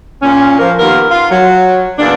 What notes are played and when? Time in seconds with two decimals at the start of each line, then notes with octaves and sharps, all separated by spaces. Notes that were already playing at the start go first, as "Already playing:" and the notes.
0.22 A#2 C#4
0.58 F3 A#4
0.79 D#2 B3 F4 A#4
1.10 F4
1.30 F#3
1.99 E2 A#2 D4